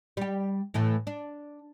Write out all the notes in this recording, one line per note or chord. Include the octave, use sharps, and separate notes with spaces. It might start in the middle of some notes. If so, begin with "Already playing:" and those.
G3 G4
A2 E3 A3
D4